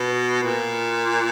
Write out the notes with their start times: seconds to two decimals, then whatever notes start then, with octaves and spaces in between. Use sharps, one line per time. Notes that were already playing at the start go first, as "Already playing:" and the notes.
Already playing: B2
0.43 A#2